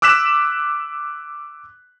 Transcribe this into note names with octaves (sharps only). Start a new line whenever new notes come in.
D6 E6 F#6 B6 E7